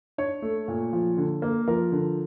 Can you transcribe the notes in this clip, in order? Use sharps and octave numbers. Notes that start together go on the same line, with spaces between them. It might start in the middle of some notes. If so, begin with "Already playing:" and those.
D4 C#5
A3
A#2
F3
D3
A#3
F3 A#4
D3